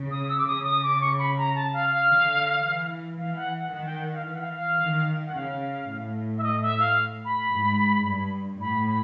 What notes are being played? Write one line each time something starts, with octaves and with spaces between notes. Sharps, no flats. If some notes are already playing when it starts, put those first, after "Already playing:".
Already playing: C#3
D#6
E6
D6
C#3 D#6
D#6
D6
C#6
B5
A#5
A5
F5
F5
D3
E3
E3 F5
F#5
F#5
D#3 F#5
G5
F#5
F5
E3 F5
F#5
F5
F5
D#3
F#5
C#3 F5
A2
E5
D#5
E5
F5
B5
G#2
G2
A2 B5
B5